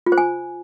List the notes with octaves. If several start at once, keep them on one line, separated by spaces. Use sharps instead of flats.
F4
C5
G#5